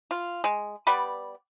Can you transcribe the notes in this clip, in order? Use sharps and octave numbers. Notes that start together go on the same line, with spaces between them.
F4
G#3
G3 B3 B4 D5